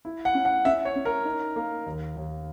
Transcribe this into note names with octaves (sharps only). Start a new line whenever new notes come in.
E4
F#5
C#4
F#5
C#4 E5
C#5
C#4
A#4
D#4
A#3
D#2
D#2